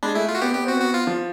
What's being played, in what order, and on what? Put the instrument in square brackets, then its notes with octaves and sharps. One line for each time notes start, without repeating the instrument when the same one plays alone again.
[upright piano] G#3 [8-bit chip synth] D4
[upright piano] A3 [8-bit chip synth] E4
[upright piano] A3 [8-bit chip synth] F4
[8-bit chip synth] F#4
[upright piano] B3 [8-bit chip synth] G4
[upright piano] B3 [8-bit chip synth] G4
[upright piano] C4 [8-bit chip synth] F#4
[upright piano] B3 [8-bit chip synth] F#4
[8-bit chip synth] F4
[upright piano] F3